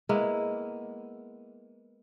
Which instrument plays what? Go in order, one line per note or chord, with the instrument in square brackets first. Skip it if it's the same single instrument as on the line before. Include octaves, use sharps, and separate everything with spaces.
[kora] G#3 A#3 B3 E4